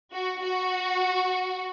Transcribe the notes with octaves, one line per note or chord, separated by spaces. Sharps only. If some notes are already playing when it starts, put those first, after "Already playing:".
F#4
F#4